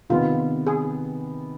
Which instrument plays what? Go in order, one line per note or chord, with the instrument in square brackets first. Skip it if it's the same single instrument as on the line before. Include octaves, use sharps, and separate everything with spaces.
[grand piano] C3 D#3 B3 [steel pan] F4
[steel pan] G#4